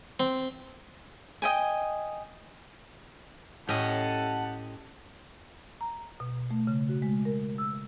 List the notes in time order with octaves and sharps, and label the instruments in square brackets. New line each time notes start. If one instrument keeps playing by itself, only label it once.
[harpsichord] C4
[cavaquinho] D#5 G5 G#5
[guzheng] A2 C#4 [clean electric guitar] G4 D#5 [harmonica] A4 F#5 A5
[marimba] A#5
B2
A3
C#3
F#4
G#3
A#4
E6